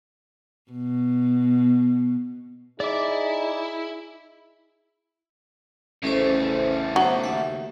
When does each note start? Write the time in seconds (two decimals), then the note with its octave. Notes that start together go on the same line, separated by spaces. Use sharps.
0.72 B2
2.80 D#4 E4 G#4 D5 D6
6.04 A1 C#3 A3 C#4 A4 C5
6.96 B1 F#3 D#4 C5
7.24 D#2 E5 F#5